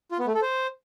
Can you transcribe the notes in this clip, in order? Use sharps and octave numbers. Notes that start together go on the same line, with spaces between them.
F4
B3
A3
A4
C5